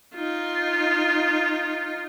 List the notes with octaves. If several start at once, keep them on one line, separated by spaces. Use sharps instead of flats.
D#4 F4